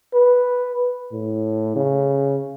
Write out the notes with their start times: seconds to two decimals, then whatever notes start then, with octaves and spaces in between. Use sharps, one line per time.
0.13 B4
1.13 A2
1.76 C#3